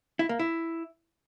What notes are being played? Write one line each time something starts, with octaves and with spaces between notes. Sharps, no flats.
E4
A#3
E4